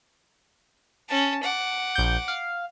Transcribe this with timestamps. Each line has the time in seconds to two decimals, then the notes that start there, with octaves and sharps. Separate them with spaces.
1.09 C#4 A5
1.43 F#5 D6
1.95 A#1 G6
2.28 F5